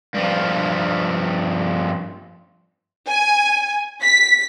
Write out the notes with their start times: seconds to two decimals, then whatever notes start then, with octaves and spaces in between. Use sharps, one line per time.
0.15 G2 F3
3.08 G#5
4.03 B6